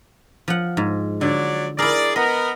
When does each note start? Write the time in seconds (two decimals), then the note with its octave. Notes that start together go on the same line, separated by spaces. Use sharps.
0.48 F3 F#5
0.77 G#2
1.21 D3 F#3 D5
1.79 E4 G#4 A#4 D5
2.16 B3 A#4 D#5